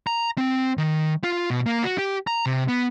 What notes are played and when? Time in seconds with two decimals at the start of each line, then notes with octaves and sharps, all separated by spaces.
0.07 A#5
0.38 C4
0.78 D#3
1.24 F4
1.50 B2
1.66 A#3
1.84 F#4
1.98 G4
2.27 A#5
2.46 C3
2.68 B3